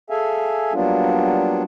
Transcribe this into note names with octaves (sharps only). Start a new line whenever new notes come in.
G#4 A4 E5 F5 G#5
F#3 G3 A#3 B3 D4 F4